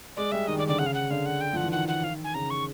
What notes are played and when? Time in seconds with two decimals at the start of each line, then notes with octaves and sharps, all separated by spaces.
0.16 G#3 D5
0.32 G3 E5
0.47 D#3 D#5
0.58 D#3 D5
0.68 D3 D5
0.79 C#3 F#5
0.86 F5
0.94 F#5
1.11 D3 F5
1.26 F#5
1.41 G5
1.53 F3 F#5
1.64 E3
1.72 D#3 F#5
1.88 F#5
2.04 F5
2.24 G#5
2.34 C#3 A#5
2.50 C#6